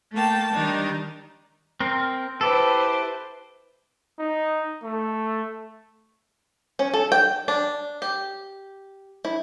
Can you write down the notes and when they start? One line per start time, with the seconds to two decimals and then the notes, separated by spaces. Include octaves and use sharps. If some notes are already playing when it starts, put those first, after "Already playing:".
0.12 A3 A#3 G5 A5
0.51 D#3 G3 D4 D#4
1.80 C4 A#4
2.41 E4 G4 A4 B4 C5
4.19 D#4
4.83 A3
6.79 C#4
6.94 A4
7.12 G5
7.48 D4
8.02 G4
9.25 E4